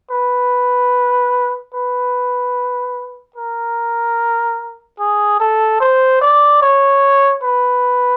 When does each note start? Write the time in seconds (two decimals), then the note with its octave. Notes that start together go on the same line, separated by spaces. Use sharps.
0.11 B4
1.74 B4
3.36 A#4
4.99 G#4
5.40 A4
5.80 C5
6.21 D5
6.62 C#5
7.43 B4